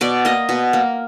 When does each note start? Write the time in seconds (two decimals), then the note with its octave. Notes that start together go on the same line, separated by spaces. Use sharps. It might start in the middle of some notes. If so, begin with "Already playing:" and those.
0.01 B2 D5
0.25 A#3 D#5
0.49 B2
0.73 A#3